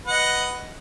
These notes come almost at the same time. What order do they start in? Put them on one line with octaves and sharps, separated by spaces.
B4 F#5 D#5